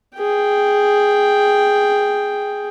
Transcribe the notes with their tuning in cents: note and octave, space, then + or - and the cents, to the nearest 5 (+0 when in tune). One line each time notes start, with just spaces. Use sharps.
G#4 +0 G5 +0